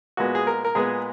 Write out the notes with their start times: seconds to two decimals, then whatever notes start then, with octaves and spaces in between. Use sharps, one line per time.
0.17 A#2 G#3 B3 F#4
0.35 G#4
0.47 A#4
0.65 A#4
0.75 A#2 G#3 B3 G#4